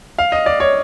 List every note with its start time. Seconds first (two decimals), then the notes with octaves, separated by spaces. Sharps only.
0.18 F5
0.32 D#5
0.46 D5
0.60 C#5